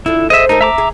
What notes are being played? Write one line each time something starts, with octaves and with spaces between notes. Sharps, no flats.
D3 E4 F4
G#4 C5 D#5 E5
A3 D#4 G4 A#4
E5 A#5 D6
G#4